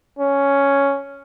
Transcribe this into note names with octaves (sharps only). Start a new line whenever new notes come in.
C#4